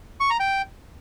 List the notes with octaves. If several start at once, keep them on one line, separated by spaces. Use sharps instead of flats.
C#6
A#5
G5